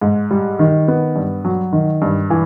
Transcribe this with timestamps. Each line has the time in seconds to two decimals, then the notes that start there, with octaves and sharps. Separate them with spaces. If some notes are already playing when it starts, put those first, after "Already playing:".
0.01 G#2
0.31 G3
0.59 D#3
0.88 B3
1.16 G2
1.45 F#3
1.73 D#3
2.02 G2
2.30 E3